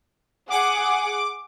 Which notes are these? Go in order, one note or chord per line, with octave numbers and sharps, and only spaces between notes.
G#4 F#5 D6